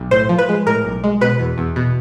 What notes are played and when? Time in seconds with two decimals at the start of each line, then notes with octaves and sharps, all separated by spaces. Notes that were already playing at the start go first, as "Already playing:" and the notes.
Already playing: B1
0.11 A2 C5
0.29 F3
0.38 B4
0.49 G#3
0.66 A2 A#4
0.85 B1
1.04 G#3
1.21 B2 B4
1.40 E2
1.58 E2
1.76 B2